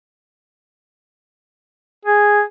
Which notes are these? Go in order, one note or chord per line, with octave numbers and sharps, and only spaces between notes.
G#4